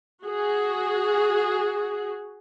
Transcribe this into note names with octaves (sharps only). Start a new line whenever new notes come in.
F#4 G#4